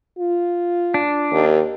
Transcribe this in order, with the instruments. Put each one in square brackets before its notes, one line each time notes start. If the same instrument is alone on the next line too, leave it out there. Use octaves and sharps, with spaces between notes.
[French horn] F4
[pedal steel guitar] D4
[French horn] D#2